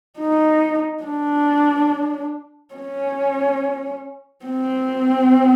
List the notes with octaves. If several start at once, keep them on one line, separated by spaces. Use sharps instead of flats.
D#4
D4
C#4
C4